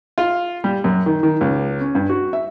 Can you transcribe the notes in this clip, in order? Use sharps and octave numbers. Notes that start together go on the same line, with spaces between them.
F4
G3
F#2
D#3
D#3
C#2
C#4
G2
F#4
E5